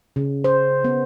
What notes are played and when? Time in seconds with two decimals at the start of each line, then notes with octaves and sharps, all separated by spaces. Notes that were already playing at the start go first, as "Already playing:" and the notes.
0.16 C#3
0.44 C5
0.84 B3